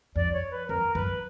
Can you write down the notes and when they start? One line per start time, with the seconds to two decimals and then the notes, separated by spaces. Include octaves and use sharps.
0.16 F2 D5
0.33 C#5
0.51 B4
0.68 F2 A#4
0.95 F#2 B4